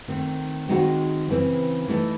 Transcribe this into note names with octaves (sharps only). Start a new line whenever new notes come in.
D#3 A3 C4
D#3 G#3 C4 D#4 F#4
C#3 E3 C4
E3 A3 D#4